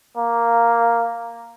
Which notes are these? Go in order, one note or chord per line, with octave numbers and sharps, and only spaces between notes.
A#3